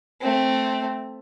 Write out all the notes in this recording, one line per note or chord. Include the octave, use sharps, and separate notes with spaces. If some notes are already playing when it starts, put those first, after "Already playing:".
A3 C4